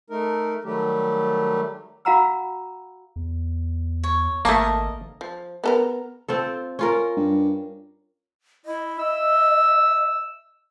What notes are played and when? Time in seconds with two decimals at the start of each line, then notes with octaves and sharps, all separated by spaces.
0.10 A3 D#4 A#4
0.65 D#3 F#3 G3 A3 G4
2.05 F#4 F5 F#5 A#5 B5 E6
3.16 E2
4.03 C#5
4.45 G#1 A3 A#3 A#4 D#5 A5
5.21 F3
5.64 B3 A4 A#4
6.29 C4 F4 A4
6.79 C#4 F4 A#4
7.17 G2
8.66 E4 D#5
8.99 E5 E6